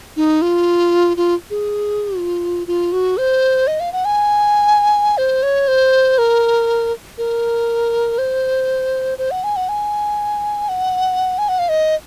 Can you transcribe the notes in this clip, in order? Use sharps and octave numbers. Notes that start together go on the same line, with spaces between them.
D#4
F4
F4
G#4
F4
F4
F#4
C5
D#5
F5
F#5
G#5
C5
C#5
C5
A#4
A#4
C5
C5
F#5
G#5
F#5
G#5
F#5
G#5
F#5
F5
D#5